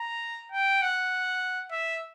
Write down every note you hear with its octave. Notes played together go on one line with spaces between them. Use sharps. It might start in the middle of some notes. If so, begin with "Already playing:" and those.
Already playing: A#5
G5
F#5
E5